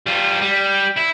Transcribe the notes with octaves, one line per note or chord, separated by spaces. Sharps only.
G3 F4
G3
E4